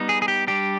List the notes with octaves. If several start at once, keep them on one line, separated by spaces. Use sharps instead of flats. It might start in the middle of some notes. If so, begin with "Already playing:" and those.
Already playing: G3 B3 D#4
G#4
G#4
G4
G3 D4 G4